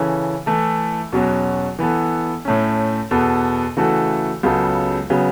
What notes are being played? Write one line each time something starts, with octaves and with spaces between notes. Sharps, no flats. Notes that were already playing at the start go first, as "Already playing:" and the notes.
Already playing: C#3 E3 C#4 A4
E3 A3 E4 A4
E2 B2 F#3 C#4 F#4
E3 B3 A4
A2 A3 C#4
E2 B2 B3 A4
C#3 E3 A3 F#4 A4
C#2 C#3 F#3 B3 A4
C#3 F#3 B3